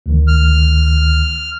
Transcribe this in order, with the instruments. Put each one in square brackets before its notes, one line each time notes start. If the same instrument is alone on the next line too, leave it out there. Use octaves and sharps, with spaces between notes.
[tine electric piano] D2 D#3
[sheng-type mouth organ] F6